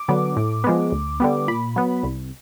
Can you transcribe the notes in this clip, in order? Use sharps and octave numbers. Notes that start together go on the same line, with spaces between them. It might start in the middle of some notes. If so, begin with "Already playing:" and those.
Already playing: D6
D3 F#3 B3
A2
F3 G#3 B3
D2
D3 G3 B3
A#2 B5
F#3 B3
C2